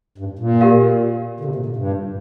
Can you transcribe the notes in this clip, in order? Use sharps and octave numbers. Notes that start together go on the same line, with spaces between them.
G2
A#2
G4 A#4 F5
D3
C3
A#2
A#2
G2